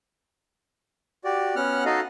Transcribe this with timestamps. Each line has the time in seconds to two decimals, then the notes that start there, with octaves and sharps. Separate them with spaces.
1.24 F#4 G4 D5
1.56 B3 C#4 F#5 F6 F#6
1.85 D#4 F#4 A4 D#5 F5